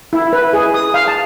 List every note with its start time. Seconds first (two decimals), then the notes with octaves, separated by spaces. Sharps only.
0.13 E4
0.33 B4
0.53 G#4
0.74 D#6
0.94 F5
1.08 A5